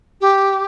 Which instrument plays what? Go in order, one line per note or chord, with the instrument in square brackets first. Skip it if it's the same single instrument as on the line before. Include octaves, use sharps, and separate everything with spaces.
[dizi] G4